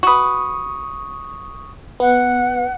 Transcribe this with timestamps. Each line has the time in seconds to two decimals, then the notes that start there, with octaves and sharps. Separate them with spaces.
0.03 F#4 B4 C#6 D#6
2.00 B3 F#5